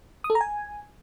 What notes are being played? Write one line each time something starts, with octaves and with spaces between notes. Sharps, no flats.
D#6
A4
A#5
G#5